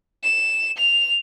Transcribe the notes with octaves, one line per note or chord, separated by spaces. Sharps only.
E7
F7